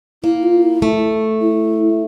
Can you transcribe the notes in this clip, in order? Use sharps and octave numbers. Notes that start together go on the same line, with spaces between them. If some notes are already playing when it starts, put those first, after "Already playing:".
A#3 E4
F4
E4
A3
E4